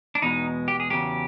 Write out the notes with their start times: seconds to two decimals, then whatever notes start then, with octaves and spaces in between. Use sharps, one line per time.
0.15 D4
0.22 E2 B2 G#3 D#4
0.68 G4
0.80 G#4
0.90 E2 C#3 F#3 G4